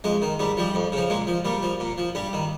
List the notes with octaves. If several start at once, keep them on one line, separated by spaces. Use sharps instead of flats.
F2 G#3
D#3
G#2 G3
F3 G3
F2
C#3 F3
A#2 G#3
F3
A#2 G3
F3
A#2
F3
G2 G3
D#3